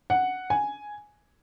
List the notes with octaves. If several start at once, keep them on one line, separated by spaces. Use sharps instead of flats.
F#5
G#5